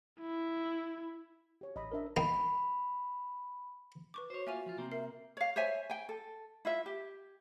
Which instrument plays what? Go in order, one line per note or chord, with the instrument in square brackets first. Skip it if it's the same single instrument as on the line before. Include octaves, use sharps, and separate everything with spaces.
[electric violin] E4
[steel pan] G4 C#5
[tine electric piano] A1 [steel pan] D#5 B5
[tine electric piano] D4 A#4 [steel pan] C5 D#5 E5
[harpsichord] A#3 D#4 G5 [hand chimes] B5
[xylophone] B4 C#6 D6
[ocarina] F#4 [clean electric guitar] C5 C#5
[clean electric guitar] A#3 F4 F5 [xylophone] E5 G#5 D#7
[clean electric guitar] F3 F4
C3 A#3 C4
[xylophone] A#4 C7 [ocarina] E5
[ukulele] C#5 F5
C5 C#5 E5 G#5
G5 G#5
A4
E4 F4 E5
G4